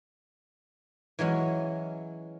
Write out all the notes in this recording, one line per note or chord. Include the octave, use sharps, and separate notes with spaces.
E3 F#3 G#3 C#4